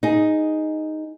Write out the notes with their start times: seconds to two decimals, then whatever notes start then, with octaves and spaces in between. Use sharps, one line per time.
0.03 D#4 G#4